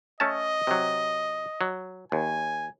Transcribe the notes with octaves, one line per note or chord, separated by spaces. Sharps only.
A3 C#4 D#5 A5
C3 F#3
F#3
D#2 G#5